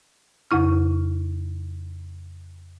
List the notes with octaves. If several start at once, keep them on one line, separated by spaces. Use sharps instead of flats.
F2 C#3 E4 F6